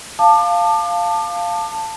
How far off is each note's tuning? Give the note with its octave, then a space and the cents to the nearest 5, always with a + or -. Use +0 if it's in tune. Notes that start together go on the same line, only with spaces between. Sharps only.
F5 +0 A5 +5 D6 +35